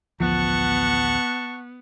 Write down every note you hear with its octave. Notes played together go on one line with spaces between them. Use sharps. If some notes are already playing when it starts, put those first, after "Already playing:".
A1 D2 F3 B3 F#5 A5 C#6